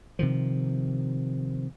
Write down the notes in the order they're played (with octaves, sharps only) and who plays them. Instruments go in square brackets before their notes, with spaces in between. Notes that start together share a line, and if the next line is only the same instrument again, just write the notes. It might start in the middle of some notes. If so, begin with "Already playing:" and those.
[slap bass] C3 D#3 F3